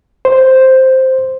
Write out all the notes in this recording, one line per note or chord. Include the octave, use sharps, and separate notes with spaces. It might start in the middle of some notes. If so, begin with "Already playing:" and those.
C5